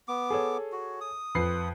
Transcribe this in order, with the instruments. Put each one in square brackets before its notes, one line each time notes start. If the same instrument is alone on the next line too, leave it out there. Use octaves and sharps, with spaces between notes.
[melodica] B3 D6
[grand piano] G#4 A4 C#5
[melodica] F#4
D#6
[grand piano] F2 B4 C7